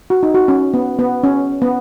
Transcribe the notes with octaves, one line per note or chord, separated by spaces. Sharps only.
F#4
D#4
F#4
C#4
B3
B3
C#4
B3